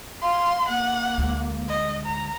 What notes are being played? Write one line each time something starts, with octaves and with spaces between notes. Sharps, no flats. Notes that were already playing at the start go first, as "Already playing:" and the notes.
F5 C6
A#3 F#5
D2 G#3
D#5
A#5